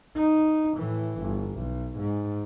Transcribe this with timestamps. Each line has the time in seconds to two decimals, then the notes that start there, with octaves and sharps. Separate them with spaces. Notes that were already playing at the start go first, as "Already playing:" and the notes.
0.15 D#4
0.77 A2 E3
1.20 G1
1.53 B1
1.98 G#2